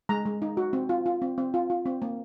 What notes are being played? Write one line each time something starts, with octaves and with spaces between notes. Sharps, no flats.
G#3 A#5
G#3
D#4
F#4
C4
F4
F4
C4
C4
F4
F4
C4
A#3